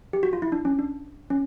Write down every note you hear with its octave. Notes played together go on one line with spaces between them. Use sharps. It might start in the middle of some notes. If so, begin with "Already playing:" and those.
G4
F#4
F4
E4
D4
C#4
D4
C#4